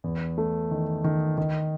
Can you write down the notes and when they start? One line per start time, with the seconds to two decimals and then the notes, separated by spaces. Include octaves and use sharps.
0.04 E2
0.38 A3
0.71 D#3
1.04 D#3
1.38 D#3